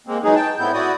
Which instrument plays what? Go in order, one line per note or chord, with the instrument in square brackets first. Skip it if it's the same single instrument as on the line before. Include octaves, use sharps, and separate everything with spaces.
[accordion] G#3 A#3 C4
E3 F#3 G#3 D#4 G#4
G5 A5
A2 B3 C4 E4 G6
E4 F#4 D5 D#6